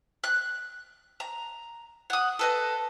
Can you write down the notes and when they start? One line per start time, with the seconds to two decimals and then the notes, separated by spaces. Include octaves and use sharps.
0.24 F#6
1.20 A#5
2.10 F#5 D#6
2.39 A4 B4 D#5